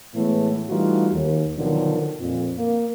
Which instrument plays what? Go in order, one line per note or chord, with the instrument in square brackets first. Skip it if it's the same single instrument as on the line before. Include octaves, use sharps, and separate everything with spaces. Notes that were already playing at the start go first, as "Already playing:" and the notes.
[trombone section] A2 E3 G#3 A3 B3
E3 G3 A3 D#4 F4 F#4
D#2
B2 D3 D#3 F3 F#3 D4
F2 A#2
A#3